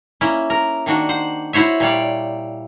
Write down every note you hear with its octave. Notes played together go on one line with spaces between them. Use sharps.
A#3 C#4 E4
A#4
D#3 A#3 D4 F#4
C5 F#5
E4 F#4 C5 C#5 E5
A#2 G3 C#5 D5